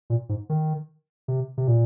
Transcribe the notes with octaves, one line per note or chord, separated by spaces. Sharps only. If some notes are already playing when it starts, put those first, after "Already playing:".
A#2
G#2
D#3
C3
C3
A#2